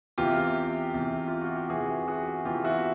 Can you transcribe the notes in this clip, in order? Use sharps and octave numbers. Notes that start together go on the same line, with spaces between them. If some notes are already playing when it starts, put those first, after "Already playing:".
E2 C3 E3 F4 G4
E2 C3 E3
F4
F#4
G4
E2 C3 E3 F#4 G#4
F#4 G#4
E2 C3 E3 F4 G4
E4 F#4